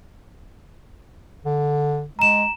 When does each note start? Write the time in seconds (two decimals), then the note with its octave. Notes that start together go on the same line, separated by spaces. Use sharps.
1.45 D3
2.19 G#3 A#5 E7